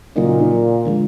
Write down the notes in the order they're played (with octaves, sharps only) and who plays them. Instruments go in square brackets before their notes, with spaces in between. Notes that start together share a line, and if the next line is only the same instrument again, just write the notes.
[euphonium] A#2 [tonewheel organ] C#3 F#3 A#3 D#4
[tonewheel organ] D3 F3 G#3